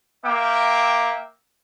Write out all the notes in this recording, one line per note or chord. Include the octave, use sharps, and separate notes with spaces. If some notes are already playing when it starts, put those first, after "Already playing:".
A#3 E5 G5 D6